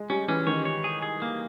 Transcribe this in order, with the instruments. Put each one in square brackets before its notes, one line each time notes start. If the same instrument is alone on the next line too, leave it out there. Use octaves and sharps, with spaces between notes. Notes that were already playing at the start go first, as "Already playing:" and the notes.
Already playing: [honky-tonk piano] G#3
[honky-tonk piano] G3 [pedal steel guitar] C#4
[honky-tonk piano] E3 [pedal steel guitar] C#4
[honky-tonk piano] D#3 [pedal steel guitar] C#5
[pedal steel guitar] C#5
G#4
G#4
A#3